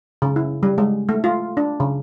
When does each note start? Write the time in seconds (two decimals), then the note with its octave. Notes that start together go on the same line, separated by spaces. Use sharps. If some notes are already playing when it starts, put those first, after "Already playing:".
0.22 C#3
0.36 E4
0.63 G3
0.78 G#3
1.09 A3
1.24 F4
1.57 D4
1.80 C#3